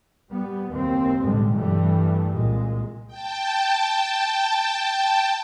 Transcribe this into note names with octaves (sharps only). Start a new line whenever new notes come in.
G3 B3
F#1 D#2 C4
B1 A2 D3 G3 G#3
G2 E3 G3 A3
C2 A#2 G#3
G5 A5